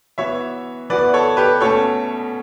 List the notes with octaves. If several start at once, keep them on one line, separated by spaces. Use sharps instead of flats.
E3 B3 F#4 C#5 E5
E3 B3 F#4 B4 D5
A4 C#5
G4 B4
B2 A3 C#4 A4 C#5